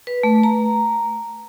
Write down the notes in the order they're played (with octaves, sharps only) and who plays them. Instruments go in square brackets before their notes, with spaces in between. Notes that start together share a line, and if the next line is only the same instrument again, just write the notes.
[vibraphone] B4
A3
A#5